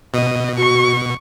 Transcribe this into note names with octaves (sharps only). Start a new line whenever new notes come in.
B2 D#5
F#4 C#6